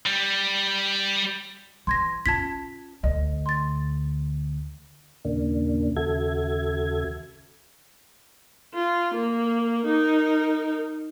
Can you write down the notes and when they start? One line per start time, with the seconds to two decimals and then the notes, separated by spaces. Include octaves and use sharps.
0.06 G3
1.87 E3 C6 G#6 A#6
2.26 C#4 F4 A5 G#6 B6
3.03 D2 D5 D#5
3.46 C6 A6
5.25 D#2 A#2 C#3 A#3 D4
5.97 D#2 C#3 F#4 A4 E5 G#6
8.74 F4
9.14 A#3
9.86 D#4 A#4